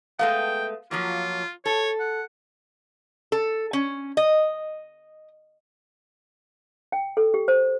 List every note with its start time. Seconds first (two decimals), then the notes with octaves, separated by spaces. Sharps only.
0.19 G#3 A3 B3 F5 G5
0.91 F3 F#3 A#3 F4
1.66 A4 C#5
2.00 F#5
3.32 A4
3.73 C#4
4.17 D#5
6.92 G5
7.17 A4
7.34 G4
7.48 C5